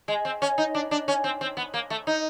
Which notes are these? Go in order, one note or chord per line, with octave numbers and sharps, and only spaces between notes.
G#3
C4
C#4
D#4
D4
D4
C#4
C4
C4
B3
A#3
A3
D#4